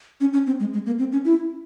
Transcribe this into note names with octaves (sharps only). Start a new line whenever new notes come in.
C#4
C#4
C4
G#3
G#3
A#3
C4
C#4
E4